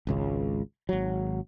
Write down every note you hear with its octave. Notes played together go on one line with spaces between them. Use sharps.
G#1 C#2 C#3
G#1 F#3